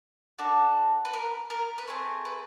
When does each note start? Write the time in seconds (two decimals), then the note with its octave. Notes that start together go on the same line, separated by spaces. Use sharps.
0.39 D4 F#4 A4
1.05 B4
1.13 A#4
1.50 A#4
1.78 B4
1.87 A3 C4 G#4 C5
2.25 B4